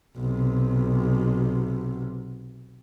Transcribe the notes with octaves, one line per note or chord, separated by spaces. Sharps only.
B1 C3